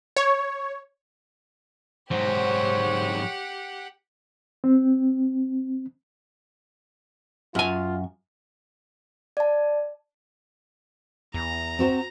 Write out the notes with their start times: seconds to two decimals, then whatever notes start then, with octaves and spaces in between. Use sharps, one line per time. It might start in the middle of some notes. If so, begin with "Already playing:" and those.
0.17 C#5
2.11 G#2 F#3 G4 C5 C#5 F#5
4.64 C4
7.55 F#2 F4 G#5
9.37 D5 A5
11.34 E2 A#5
11.79 C4 F#4 C5